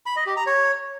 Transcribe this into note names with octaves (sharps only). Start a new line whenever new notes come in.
B5
D#5
G4
A#5
C#5